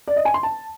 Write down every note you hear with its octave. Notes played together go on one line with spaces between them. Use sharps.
D5
D#5
G#5
C6
A5